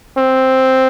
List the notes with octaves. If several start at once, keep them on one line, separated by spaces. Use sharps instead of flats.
C4